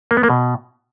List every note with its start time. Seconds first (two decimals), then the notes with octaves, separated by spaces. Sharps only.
0.11 A#3
0.17 B3
0.23 A#3
0.30 B2